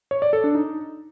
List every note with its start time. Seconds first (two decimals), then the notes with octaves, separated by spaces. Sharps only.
0.11 C#5
0.22 D5
0.33 A4
0.44 D4
0.55 D#4